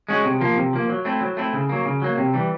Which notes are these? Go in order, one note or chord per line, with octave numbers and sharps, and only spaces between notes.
G#3 C#4 F#4
C3
F3 A#3
C3
F3 A#3
F#3
A3 C4 E4
F#3
A3 C4 E4
C#3
F#3 A#3
C#3
F#3 A#3
C3
E3 G3